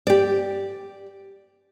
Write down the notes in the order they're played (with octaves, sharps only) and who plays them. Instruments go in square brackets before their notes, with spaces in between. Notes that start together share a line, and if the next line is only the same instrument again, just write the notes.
[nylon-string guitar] G4 D5